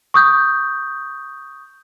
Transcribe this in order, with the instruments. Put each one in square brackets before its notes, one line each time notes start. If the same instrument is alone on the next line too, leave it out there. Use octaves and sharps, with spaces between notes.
[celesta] C#6 D#6 G6